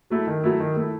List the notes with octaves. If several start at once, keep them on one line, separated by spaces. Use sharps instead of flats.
F#3 A3 E4
D#3
F#3 A3 E4
D#3
A3 E4